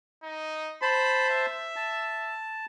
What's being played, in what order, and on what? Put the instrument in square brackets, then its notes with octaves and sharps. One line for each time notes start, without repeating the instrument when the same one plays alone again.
[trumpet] D#4
[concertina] C5 A5 [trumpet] B5
[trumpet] E5
[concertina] A5